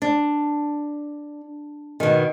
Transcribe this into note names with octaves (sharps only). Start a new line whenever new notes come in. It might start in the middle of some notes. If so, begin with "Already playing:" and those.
D4
B2 D#3